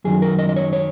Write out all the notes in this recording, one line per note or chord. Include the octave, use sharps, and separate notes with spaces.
F#2 D#3 F#3 G#4
A#4
D#5
D#5
C#5
C#5